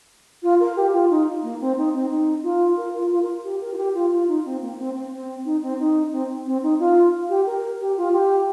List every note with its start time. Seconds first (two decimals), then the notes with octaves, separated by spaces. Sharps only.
0.43 F4
0.60 A#4
0.76 G4
0.93 F4
1.10 D#4
1.43 A#3
1.60 C4
1.77 D#4
1.94 C4
2.11 D#4
2.43 F4
2.77 A#4
2.94 F4
3.11 F4
3.22 A#4
3.44 G4
3.61 A#4
3.73 F4
3.77 G4
3.94 F4
4.12 F4
4.28 D#4
4.45 C4
4.61 A#3
4.78 C4
4.95 C4
5.11 C4
5.45 D#4
5.62 C4
5.79 D#4
6.12 C4
6.46 C4
6.63 D#4
6.79 F4
7.29 G4
7.46 A#4
7.80 G4
7.97 F4
8.13 G4